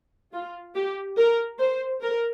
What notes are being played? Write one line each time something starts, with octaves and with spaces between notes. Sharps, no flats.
F4
G4
A#4
C5
A#4